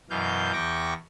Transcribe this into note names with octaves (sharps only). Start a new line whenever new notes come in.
F#2 B2 E3 F5 G6
E2 G5 C#6 D6 A#6